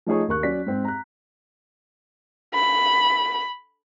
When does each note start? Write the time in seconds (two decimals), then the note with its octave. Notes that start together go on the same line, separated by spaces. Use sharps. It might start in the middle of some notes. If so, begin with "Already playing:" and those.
0.06 F3 A3 D#4 G#4 C#5
0.28 D#2 A#3 C#6 F#6
0.43 F#3 C#4 D5 B6
0.66 G#2 C4
0.84 A#5 F#6
2.54 B5